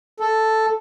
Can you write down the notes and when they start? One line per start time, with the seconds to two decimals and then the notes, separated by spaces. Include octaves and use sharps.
0.20 A4